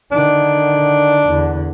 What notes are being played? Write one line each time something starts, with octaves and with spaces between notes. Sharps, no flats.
D3 D#3 D4
E2 D3